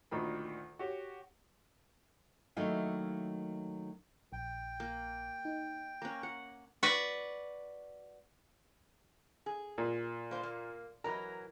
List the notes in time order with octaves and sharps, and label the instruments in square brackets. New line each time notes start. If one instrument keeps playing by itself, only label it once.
[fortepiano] D2 A#2 D#3 A#4 B5
F#4 G4 C#5
[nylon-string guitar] D#3 F#3 A3 A#3 E4
[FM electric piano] A#1 [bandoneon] G5
[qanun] A#3
[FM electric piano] D#4
[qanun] A#3 C#4 [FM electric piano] A#5
[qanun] F#5
[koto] F#4 B4 D5
[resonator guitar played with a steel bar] G#4
[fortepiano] A#2
[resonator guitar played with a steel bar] A#3 C5
A#3
[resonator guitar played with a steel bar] E3 F#3 A#4 [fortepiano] A#5